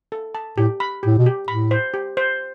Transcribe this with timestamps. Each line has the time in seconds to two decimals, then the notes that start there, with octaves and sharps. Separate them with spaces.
0.12 A4
0.35 A5
0.58 A2 G4
0.80 B5
1.03 A2 G4
1.18 B2
1.26 G4
1.48 A2 B5
1.71 C5
1.94 G4
2.17 C5